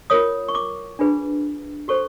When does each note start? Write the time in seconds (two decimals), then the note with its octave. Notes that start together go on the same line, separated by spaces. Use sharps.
0.10 F4 A#4 C#5 D#6
0.48 C#6
0.55 D6
0.99 D4 F4 G#4 B4
1.88 F#4 A4 C5 C#6